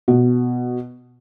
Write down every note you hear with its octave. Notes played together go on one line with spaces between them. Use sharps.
B2